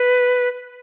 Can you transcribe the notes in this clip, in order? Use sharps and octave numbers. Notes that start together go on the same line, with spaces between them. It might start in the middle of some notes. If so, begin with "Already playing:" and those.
Already playing: B4